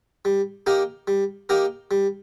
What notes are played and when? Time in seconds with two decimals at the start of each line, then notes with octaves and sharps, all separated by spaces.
0.25 G3
0.66 A#3 D#4 G4 A#4
1.08 G3
1.49 A#3 D#4 G4 A#4
1.91 G3